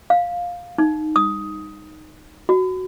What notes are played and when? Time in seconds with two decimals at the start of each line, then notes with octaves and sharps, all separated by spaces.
0.10 F5
0.78 D#4
1.16 D#6
2.49 F#4